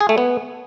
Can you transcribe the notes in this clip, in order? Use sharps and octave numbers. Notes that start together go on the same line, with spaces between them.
G#4
A3
B3